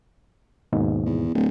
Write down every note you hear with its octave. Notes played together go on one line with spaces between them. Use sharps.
D#2 G#2 B2
E2
D1